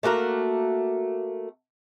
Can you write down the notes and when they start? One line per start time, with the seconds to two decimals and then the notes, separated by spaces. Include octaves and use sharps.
0.03 A3 A#3 F#4 A#4